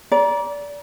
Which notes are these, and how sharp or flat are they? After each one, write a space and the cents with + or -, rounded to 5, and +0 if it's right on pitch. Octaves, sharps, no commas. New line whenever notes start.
D5 -20 A#5 +30